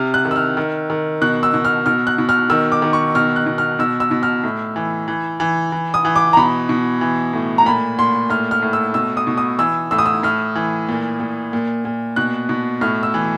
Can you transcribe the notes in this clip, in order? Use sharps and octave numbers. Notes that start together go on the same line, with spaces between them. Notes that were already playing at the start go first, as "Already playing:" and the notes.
Already playing: C3 F6
F#6
D#3
E6
F6
D#3
D#3
B2 F#6
E6
B2
F6
B2 F6
F#6
B2
F6
D#3 E6
D6
D#3
C#6
B2 F6
F#6
B2
F6
B2 E6
E6
B2
F6
A2
E3
E3
E3
E3
D#6
E3
D6
A#5
B2 B5
B2
E3
A2
A#5
A#2 B5
A#2 C6
A2 F6
F6
A2
E6
B2 E6
D#6
B2
D#6
E3 E6
A2 E6
D#6
E6
A2 F6
E3
A#2
A#2
A#2
A#2
B2 F#6
B2
A2 F6
E6
E3